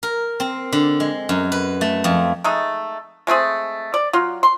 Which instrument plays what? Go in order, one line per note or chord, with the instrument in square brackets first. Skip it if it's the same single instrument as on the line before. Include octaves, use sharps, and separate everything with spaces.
[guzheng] A#4
C4
D3
G#3
F#2
B4
A3
F2
[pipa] G#3 A3 D#4
G#3 A3 C4 G#4
D5
F#3 F4
C6